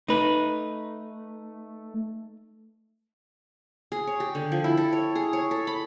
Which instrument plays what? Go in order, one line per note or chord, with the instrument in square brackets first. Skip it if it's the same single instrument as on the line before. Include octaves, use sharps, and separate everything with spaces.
[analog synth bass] A3 [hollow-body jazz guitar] D#4 B4
[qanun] G#4
C#5
G4
D3
F3
E4
A4
C#5
G#4
C#5
A4
B5